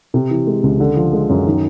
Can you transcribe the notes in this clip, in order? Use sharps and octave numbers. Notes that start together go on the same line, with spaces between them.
C3
E3
G#3
C#2
D3
F3
G#3
F#2
D#3